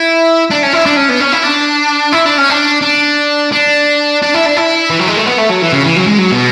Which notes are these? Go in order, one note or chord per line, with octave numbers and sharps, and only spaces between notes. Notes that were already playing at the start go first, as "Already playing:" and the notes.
Already playing: E4
D4
C#4
E4
D4
C#4
B3
C#4
E4
D4
E4
D4
C#4
D4
D4
D4
D4
E4
D4
E4
E3
F#3
G#3
A3
B3
A3
F#3
E3
C#3
E3
F#3
G#3
F#3
B2